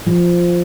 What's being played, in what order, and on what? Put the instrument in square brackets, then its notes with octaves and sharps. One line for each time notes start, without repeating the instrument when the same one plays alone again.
[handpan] F3